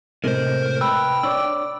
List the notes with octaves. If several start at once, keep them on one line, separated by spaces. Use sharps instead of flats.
A2 C3 G#3 A#4 C5
B4 G5 E6
D4 C#5 D5 E6